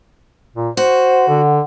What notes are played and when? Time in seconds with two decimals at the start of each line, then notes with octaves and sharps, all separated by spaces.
0.56 A#2
0.77 F#4 C5
1.28 D3